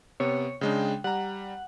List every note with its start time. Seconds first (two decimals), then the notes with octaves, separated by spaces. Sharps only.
0.20 C3 B3 C#5
0.61 C#3 G#3 D4 G5
1.04 G3 F#5 A#5